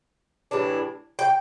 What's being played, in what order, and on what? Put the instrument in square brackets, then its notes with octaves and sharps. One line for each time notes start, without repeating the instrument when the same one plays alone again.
[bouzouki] A2 E3 G3 D4
G5